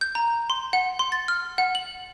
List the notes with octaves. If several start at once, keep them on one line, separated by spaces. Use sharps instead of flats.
G6
A#5
C6
F#5
C6
A6
F6
F#5
F#7